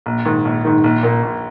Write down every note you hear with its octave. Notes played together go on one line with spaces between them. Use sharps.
A#1
G#2 D#3
A#1
G#2 D#3
A#1
A#2 A#3
A#1